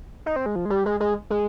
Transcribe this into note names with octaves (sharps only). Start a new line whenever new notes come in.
D#4
C4
G#3
F3
G#3
G3
G#3
G#3
G#3